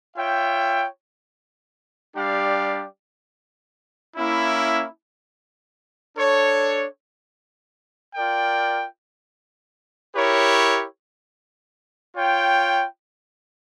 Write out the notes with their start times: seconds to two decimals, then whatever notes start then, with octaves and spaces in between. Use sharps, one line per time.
0.17 F4 C#5 E5 G5
2.16 G3 D4 G4 D5 F5
4.17 A#3 C#4 E4
6.16 D4 A4 C#5
8.15 F4 A#4 D5 G5
10.15 E4 G4 A#4 C#5
12.15 F4 C#5 G5